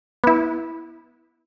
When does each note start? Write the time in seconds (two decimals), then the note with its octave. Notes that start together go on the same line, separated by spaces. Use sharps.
0.24 B3 E4